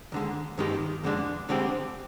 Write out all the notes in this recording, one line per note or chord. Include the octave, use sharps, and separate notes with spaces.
D#2 D3 G#3
G2 D#3 G#3 D#4 G4
F2 D3 G#3 D4
D2 D3 G#3 C4 G4